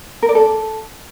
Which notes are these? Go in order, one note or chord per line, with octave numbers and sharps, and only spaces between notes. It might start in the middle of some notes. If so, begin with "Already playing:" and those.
A#4
D5
A4